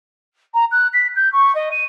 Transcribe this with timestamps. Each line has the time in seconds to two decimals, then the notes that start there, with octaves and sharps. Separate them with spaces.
0.54 A#5
0.71 F#6
0.93 B6
1.16 G6
1.33 C#6
1.55 D#5
1.72 D#7